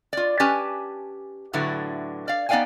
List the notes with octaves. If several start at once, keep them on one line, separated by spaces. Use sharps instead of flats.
F4 D5
C#4 G4 B4 G#5 A5
A2 D3 F#3 E4 B4
D5 F5
B3 D#4 D5 F5 G5 G#5